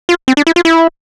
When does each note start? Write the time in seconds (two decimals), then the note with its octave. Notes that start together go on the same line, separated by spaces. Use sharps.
0.09 F4
0.28 C4
0.37 D4
0.47 E4
0.56 F4
0.65 E4